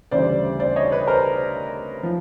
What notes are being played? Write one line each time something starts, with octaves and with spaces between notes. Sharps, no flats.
D2 C#3 E3 G3 C5 D5
C5 D5
C#5 D#5
B4 C#5
A#4 C5
F3